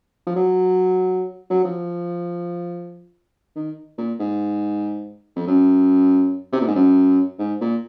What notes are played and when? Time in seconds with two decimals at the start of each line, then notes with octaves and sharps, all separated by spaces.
0.27 F3
0.36 F#3
1.50 F#3
1.64 F3
3.56 D#3
3.98 A#2
4.20 G#2
5.36 F2
5.47 F#2
6.53 C3
6.61 A#2
6.68 G#2
6.75 F#2
7.39 G#2
7.61 A#2